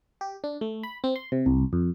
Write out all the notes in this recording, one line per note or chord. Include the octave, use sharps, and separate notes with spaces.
G4
D4
A3
B5
C4
C6
C3
C2
F2